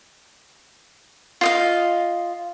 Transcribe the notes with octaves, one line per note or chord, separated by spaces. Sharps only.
F4 D#5 F5